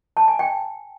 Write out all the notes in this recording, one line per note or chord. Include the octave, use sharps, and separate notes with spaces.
A5
G#5
G5